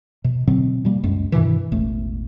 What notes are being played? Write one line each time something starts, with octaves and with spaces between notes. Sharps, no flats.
B2
B2 D3 F#3 C4
B2 G3 A#3
C#2 F#2 G#3
G2 B2 D#3 E3
E1 A1 A3